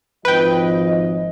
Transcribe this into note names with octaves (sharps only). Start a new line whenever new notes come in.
G#1 F3 B4 D#5 G5